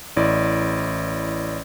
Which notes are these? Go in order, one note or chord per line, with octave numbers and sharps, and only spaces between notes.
A1 E4 D5